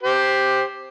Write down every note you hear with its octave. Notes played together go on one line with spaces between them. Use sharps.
G4 C5